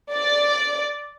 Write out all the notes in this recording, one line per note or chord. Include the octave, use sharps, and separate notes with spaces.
D5